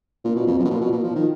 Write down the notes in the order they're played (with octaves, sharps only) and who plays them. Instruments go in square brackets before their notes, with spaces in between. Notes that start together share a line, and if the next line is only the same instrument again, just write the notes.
[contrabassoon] A#2
B2
F2
F#2
B2
A#2
B2
A#2
F3
D#3